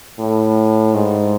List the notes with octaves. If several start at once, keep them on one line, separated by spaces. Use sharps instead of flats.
A2
G#2